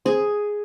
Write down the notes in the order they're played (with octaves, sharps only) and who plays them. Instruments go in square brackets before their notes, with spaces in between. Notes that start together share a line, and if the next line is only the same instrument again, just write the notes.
[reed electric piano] C4 C5 [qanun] G#4